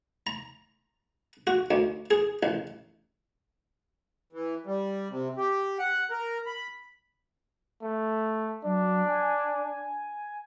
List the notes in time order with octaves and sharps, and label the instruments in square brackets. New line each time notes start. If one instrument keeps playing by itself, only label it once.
[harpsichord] A#5
F#4
D2
G#4
A1
[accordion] E3
G3
C3
G4
F#5
A#4
B5
[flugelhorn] A3
[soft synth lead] F#3 [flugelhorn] D4
[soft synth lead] G#5